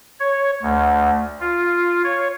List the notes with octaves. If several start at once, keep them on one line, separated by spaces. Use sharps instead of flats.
C#5
D2
F4
C#5